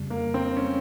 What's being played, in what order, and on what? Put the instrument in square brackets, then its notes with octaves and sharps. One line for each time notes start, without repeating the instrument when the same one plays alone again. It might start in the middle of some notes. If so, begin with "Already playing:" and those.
Already playing: [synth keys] F2 C#3 G3
[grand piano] A#3
C4
C#4